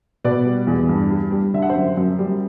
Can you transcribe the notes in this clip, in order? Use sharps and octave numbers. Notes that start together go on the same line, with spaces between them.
B2 B4 D5
G3
E2
G2
G3
G3
D3 E5
F#5
C5 E5
F#2
F#2
G3